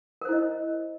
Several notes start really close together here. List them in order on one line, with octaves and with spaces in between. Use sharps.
A#4 C5 E4 D#5